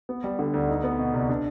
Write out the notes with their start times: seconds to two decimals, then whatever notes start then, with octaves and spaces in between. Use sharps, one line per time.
0.09 B3
0.24 G3
0.39 D3
0.54 D2
0.69 D#4
0.84 B3
0.99 B2
1.14 C2
1.29 D4